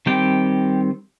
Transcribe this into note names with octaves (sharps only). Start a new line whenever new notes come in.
D#3 G3 C4 G4 G5